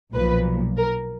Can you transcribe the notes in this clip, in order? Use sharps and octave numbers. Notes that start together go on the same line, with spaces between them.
B1 A#2 F3 B4
A#4